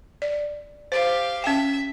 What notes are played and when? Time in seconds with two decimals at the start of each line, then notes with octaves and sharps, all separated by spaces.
0.22 D5
0.92 G4 C5 F5
1.44 C#4 E5 G5